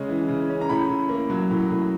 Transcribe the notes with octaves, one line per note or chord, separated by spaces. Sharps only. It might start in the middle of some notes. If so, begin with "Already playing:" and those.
Already playing: C#3 G#3 C#4
E3
C#3
C#4
A#5
A2 B5
A2
A#3
F#3
A2
A2